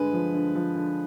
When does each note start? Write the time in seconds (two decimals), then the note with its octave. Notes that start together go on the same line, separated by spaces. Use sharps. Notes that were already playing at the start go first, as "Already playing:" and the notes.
Already playing: G2 D3 G#3 B4
0.13 F3
0.34 D3
0.55 F3
0.75 D3